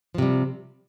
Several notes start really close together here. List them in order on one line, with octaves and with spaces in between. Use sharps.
F3 C3 G3